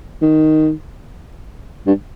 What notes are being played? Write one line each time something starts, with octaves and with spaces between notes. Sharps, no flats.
D#3
G2